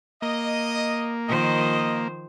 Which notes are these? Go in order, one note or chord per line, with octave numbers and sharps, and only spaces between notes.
A#3 D#5
D#3 F3 C5 D#5